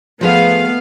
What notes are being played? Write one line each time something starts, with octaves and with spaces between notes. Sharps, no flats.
F3 A3 B3 G#4 B4 F5